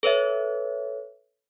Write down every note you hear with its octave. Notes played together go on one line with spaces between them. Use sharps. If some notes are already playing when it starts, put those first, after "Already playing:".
A4 B4 C#5 E5